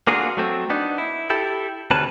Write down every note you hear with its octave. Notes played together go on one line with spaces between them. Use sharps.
A#3 D4 F4 F#4 G#4
F#3 A3 C4
B3 D4 D#4
E4
E4 G4 A4
D2 C3 C#4 B4 A5